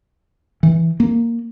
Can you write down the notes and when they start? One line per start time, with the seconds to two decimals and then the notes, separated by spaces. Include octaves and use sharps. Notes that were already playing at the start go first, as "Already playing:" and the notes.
0.63 E3
1.00 A#3